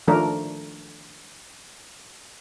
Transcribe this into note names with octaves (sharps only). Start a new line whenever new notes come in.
D#3 F3 A3 D4 A#4